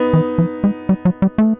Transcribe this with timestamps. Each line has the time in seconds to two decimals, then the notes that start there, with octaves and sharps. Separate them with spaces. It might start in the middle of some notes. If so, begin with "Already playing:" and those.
Already playing: B3 D#4
0.13 E3
0.38 F3
0.64 G#3
0.89 G3
1.05 F#3
1.22 G3
1.38 A3